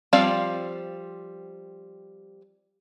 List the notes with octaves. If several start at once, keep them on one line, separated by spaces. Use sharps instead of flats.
F3 G3 C4 D5 F5